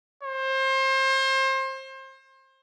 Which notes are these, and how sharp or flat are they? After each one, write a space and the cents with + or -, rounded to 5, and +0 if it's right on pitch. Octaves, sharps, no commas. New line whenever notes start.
C5 +30